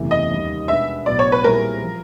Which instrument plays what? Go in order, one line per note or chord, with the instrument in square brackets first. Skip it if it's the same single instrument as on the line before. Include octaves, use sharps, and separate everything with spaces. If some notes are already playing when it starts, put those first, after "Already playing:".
Already playing: [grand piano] F#1 E2 C3 E3 A3
[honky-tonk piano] D#5
[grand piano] D#2 D#3 G3
[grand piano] B2 G#3 B3 D4 [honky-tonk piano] E5
[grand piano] B1 A2 F#3 B3 [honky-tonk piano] D5
[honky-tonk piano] C#5
B4
[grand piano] A#2 G3 C4 E4 G#4 [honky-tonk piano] A#4
[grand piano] F3